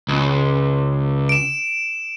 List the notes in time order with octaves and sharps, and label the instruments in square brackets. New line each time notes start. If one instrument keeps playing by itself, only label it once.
[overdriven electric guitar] C#2
[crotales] D7 E7